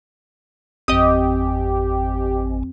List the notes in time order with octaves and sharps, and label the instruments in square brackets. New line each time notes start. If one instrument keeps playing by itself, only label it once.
[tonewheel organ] G#1 [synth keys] F2 C4 [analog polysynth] G4 [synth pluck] D#5 D#6